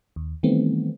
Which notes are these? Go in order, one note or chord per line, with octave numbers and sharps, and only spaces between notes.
D#2
D#3 E3 G3 A3 B3 C4